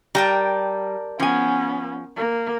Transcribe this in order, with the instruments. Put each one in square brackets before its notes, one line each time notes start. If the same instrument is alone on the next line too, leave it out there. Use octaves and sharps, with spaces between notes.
[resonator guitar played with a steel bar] G3 [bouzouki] A#4 G5 A5
[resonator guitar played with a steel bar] F3 G#5 [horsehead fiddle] B3 C#4
[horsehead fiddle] A#3